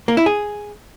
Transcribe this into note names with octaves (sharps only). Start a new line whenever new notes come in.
A#3
E4
G#4